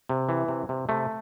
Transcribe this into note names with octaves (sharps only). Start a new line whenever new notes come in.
C3
E3
C3
C3
C3 A3